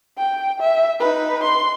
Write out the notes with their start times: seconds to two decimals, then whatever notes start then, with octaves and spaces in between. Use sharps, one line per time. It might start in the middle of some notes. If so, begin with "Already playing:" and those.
0.18 G5
0.60 E5
1.00 D#4 B4
1.43 C6